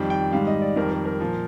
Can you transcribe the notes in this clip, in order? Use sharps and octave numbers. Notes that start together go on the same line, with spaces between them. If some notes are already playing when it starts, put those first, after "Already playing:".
Already playing: F2 D#3 G3 G5
G5
G#2 D#3 G3 F5
D#5
D5
F2 D#3 G3 A#4
A#4
A#4
A#2 F3